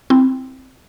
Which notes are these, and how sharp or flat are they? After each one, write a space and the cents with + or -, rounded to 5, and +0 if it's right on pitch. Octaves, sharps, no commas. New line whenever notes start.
C4 +0 E4 +0